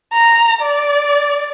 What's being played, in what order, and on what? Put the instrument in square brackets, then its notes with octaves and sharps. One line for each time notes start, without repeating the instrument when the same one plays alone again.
[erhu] A#5
D5